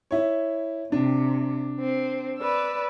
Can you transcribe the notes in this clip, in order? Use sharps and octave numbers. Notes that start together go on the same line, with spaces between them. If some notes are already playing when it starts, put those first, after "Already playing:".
E4 C#5
C3 D4
C4
B4 D5 E6